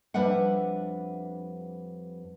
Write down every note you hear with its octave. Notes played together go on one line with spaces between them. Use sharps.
F2 G3 D4 B4 E5 F#5